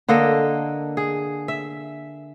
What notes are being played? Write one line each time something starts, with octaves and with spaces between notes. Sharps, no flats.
D3 A#3 A4 D#5
G#4
E5